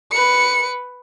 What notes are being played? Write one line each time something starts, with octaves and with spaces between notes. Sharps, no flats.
B4 C#7